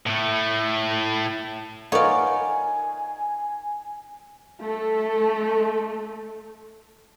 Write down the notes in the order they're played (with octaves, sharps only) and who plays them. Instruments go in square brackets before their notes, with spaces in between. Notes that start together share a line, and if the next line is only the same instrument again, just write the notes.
[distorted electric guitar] A2 A3
[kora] D#4 F4 [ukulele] A#4 B4 F#5 [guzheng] C#5 D5 [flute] G#5
[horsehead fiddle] A3 A4